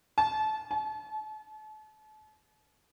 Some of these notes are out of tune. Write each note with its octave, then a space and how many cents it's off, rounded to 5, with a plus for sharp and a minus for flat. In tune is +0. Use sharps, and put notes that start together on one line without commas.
A5 -25
A5 -40